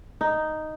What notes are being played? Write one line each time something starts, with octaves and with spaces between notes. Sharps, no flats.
D#4